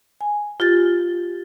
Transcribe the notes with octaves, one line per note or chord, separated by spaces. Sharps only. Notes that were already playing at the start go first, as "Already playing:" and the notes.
G#5
F4 G4 A6